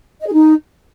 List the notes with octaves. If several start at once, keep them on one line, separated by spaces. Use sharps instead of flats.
D#5
G#4
D#4